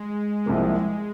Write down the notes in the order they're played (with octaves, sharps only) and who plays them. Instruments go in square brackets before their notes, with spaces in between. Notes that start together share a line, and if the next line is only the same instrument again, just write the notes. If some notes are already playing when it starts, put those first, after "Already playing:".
Already playing: [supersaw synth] G#3
[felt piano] C2 C3 F3 A#3